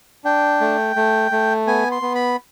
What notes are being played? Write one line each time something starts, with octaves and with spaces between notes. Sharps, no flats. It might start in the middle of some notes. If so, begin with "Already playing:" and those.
D4 G5
A3
A3
A3
B3 G#5
C6
B3
B5